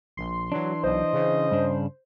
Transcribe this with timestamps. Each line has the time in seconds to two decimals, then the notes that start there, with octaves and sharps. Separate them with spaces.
0.17 A#1 C6
0.52 E3 F#3 D4
0.84 B1 C5 D#5
1.13 C#3
1.51 G2 D4